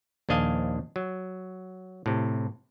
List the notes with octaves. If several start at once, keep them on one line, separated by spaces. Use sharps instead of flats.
A#1 D#2 D4 D#5 F5 G#5
F#3
A2 C3